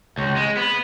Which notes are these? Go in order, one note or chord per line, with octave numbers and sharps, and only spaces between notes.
C#2
G#3
B3